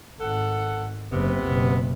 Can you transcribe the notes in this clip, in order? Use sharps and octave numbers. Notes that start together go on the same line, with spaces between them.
G#1 A4 F#5
F#1 C3 B3
F#1 B2